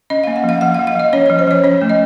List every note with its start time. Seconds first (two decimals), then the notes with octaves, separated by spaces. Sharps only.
0.10 C#4 D#5
0.24 A#3 F5
0.36 F#5
0.44 F3
0.49 F5
0.61 F3 F#5
0.75 F5
0.79 F3
0.87 F5
0.95 F3 D#5
1.13 C#4 C#5
1.26 C#5
1.30 F3
1.39 C5
1.48 F3 C#5
1.63 C#4 C#5
1.82 A3
1.89 D#5